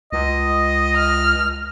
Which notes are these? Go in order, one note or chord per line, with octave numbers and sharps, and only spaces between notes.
C#2 D#5
F6